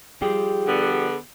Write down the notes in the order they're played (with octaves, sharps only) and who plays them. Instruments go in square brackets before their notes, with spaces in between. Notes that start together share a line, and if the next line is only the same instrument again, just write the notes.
[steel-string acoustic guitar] F3 G3 G4 [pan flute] G#4
[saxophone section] D3 B3